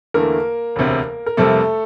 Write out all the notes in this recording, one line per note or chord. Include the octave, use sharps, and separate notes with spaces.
E2 D3 A3 A#3 A#4
E1 D2 C3
A#4
F2 C3 G3 A3 A#3 A4